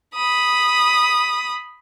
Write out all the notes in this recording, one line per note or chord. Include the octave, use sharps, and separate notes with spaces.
B5 D#6